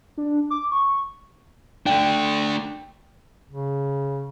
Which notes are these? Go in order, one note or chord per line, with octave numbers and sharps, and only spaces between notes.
D4
D6
C#6
A3 D4 G5
C#3